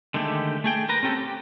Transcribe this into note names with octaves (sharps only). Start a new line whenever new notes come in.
D3 D#3 G#3 A3 G4
A3 G#4 G5
A#4 B4 A#5
C4 C#4 G4 A4
G4